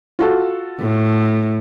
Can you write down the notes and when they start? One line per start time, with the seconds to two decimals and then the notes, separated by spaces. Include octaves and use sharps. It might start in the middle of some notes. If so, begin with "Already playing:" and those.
0.19 F4 F#4 A4
0.80 A2